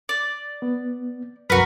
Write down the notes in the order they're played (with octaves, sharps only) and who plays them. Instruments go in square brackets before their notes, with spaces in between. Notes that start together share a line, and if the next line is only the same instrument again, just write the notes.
[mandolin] D5
[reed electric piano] B3
[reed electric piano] C2 F#2 [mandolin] F#4 A#4 [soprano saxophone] B4